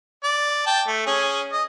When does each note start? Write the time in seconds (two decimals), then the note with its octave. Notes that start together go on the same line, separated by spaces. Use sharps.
0.24 D5
0.66 G5 A5
0.88 A3
1.06 C#4 G#4
1.52 D#5